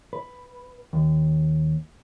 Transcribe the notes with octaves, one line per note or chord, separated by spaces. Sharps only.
B4
D#2